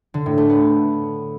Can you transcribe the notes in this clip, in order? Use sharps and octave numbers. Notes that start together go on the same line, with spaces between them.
D3
A2
A3
B3